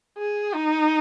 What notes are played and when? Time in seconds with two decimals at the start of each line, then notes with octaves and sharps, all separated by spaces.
0.18 G#4
0.54 D#4